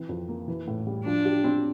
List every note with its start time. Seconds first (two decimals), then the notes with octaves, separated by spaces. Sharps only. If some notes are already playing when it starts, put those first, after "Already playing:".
Already playing: E3 C4
0.09 F2
0.29 A#3
0.48 E3
0.67 A2
0.87 G3
1.05 F3 D4
1.25 G4
1.44 C4